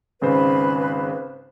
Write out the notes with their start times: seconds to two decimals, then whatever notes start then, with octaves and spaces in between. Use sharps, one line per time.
0.21 G#1 C#3 B4 C5